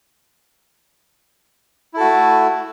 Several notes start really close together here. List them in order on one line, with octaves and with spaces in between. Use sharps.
E4 A4 F#4 A3